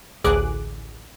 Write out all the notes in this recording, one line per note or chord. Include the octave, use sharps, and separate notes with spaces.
A1 D2 G#4 D6 F#6